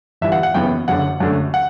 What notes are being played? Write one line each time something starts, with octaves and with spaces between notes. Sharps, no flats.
G1 G2 E3 E5
F#5
F#5
F#1 F#2 E3 B3 G5
F#1 F#2 D3 F#5
F#2 D3 A3
F#5